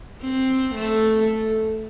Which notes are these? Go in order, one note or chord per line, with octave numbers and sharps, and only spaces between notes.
C4
A3